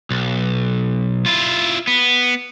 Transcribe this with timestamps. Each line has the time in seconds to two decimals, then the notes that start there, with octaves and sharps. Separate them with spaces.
0.10 B1
1.26 E4 F4
1.88 B3